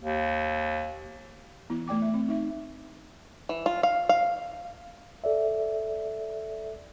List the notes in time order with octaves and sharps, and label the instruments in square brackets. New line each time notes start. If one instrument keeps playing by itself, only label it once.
[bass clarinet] D#2
[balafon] E3 B3 E4
A3 D5 G5 D6
E5
C4
D#4 E5
[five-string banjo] E3
F4
F5
F5
[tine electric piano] A4 D5 E5